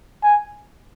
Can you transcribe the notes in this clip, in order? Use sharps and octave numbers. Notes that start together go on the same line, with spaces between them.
G#5